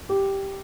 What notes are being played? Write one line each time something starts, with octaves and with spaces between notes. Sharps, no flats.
G4